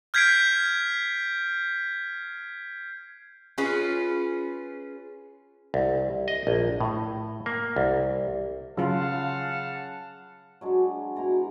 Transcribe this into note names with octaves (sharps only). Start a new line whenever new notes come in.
F6 G6 G#6 B6 C7 D7
C#4 F4 G#4 B4
C2
D#5
A#1
A2
A#3
C2
C#3 F#3 F4 F5 F#5 A5
F#3 G#3 D4
B2 E4 A#5 C6